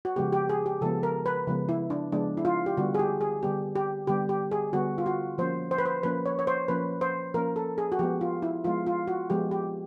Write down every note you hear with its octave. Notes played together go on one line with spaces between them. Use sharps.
F#4
C#3 F3 G#3 B3 G4
G4
G#4
G4
C#3 F3 G#3 B3 A4
A#4
B4
C#3 F3 G#3 B3
E4
D4
C#3 F3 G#3 B3 D4
E4
F4
G4
D3 G3 B3 F#4
G#4
G4
G#4
D3 G3 B3 G4
G4
D3 G3 B3 G4
G4
G#4
D3 G3 B3 F#4
F4
F#4
F3 A#3 C#4 C5
C5
B4
C5
F3 A#3 C#4 B4
C#5
C#5
C5
F3 A#3 C#4 B4
C5
F3 A#3 C#4 A#4
A4
G#4
F#4
F3 G#3 B3 G4
F4
E4
F3 G#3 B3 F4
F4
F#4
F3 G#3 B3 G4
G4